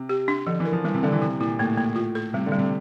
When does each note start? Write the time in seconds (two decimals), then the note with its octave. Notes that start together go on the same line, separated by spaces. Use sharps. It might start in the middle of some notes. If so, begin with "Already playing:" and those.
Already playing: C3
0.09 G4
0.28 D4
0.47 D3 F3
0.60 E3
0.65 A#4
0.72 F3
0.84 E3 G3
0.94 C3
1.03 D3 G3
1.13 E3
1.22 C3 E4
1.40 A#2 E4
1.59 A2 A#3
1.77 A#3
1.96 F4
2.15 A4
2.33 C3 G3
2.46 D3
2.52 G3
2.58 C3